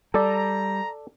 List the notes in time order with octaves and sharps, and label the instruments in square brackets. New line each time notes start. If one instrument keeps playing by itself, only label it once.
[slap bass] G3 [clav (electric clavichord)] A4 D5 [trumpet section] A#5